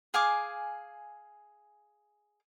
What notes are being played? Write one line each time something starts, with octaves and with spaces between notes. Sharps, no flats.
G#4 F5 G#5 D6